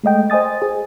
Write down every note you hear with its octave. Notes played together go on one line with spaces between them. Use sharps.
G#3 A3 D#5 G5
C5 D#5 G#5 D#6 A6
G#4